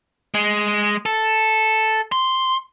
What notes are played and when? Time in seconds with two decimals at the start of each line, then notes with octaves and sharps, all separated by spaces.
0.34 G#3
1.06 A4
2.12 C6